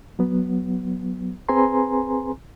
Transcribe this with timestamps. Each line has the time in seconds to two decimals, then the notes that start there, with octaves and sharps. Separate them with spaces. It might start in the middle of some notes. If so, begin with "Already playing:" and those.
0.19 F#3 B3
1.49 C4 G#4 B4 G#5 A#5 C6